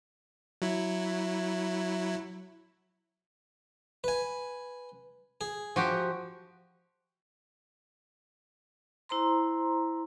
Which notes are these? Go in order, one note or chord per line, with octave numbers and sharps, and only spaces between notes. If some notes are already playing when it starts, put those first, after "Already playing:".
F#3 E4
B4 G#5
G#4
F3 F#4 G4
E4 C5 A#5 C6